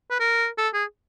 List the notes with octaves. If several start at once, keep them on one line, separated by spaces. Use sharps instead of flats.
B4
A#4
A4
G#4